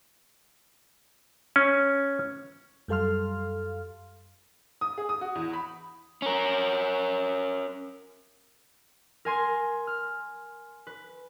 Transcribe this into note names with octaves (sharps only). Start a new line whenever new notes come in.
C#4
F#2 G3 A4 F5 C6 F6
D#6
G#4
D#6
F#4
E2
B5
C#4 A#4
A#4 G#5 C6
F6
B4